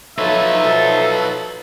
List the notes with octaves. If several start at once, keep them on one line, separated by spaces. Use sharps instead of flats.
F3 F#3 D#4 A4 B4 C#5 E5 A5
A4